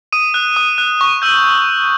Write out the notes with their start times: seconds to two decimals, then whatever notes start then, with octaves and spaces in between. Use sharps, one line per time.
0.13 D#6 D#7
0.34 F#6
0.56 D#6
0.78 F#6
1.01 C#6
1.22 E6 G6